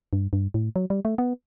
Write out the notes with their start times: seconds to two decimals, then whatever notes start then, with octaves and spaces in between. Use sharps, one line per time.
0.13 G2
0.33 G2
0.54 A2
0.76 F#3
0.90 G3
1.05 A3
1.18 B3